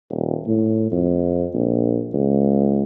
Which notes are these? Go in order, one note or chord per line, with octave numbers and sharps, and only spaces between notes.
D#1
A2
F2
A#1
C#2